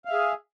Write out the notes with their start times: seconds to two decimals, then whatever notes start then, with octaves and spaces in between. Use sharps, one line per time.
0.05 F5
0.09 E5
0.13 G#4